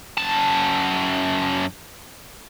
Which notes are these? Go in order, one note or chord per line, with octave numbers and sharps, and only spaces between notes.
F#2 A5